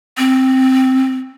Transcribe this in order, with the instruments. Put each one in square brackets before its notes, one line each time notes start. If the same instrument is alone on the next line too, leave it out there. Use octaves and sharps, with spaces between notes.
[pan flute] C4